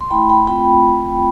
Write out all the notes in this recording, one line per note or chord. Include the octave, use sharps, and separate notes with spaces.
C6
A3 E4 G5 B5
G5 B5
A3 C4 F4 G5 B5